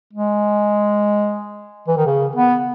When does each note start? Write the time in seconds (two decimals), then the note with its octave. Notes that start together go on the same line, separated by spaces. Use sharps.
0.13 G#3
1.88 E3
1.97 D#3
2.06 C#3
2.35 B3